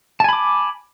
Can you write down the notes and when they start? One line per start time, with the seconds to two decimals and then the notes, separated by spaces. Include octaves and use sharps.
0.20 A5
0.24 G#5
0.29 B5
0.33 D6